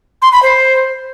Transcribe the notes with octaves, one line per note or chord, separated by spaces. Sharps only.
C6
B5
C5